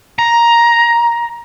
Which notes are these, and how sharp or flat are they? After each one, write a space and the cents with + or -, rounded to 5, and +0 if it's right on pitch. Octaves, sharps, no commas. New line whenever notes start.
A#5 +10